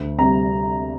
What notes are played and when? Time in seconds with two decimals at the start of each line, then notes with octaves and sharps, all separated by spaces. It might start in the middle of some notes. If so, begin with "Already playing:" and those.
Already playing: D2
0.18 C3 G3 A#5